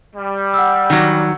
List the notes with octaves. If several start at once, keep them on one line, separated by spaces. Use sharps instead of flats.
G3
F#5 E6
D#3 F#3